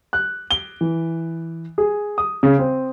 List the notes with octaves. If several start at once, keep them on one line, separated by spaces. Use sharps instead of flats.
F#6
G7
E3
G#4
D#6
C#3
C4